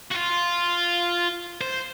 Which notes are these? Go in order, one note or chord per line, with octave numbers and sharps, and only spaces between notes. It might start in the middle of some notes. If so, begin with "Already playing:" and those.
F#4
F4
C5